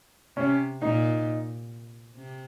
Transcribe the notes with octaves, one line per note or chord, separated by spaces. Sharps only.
C3 C#4
A#2 D#4
C3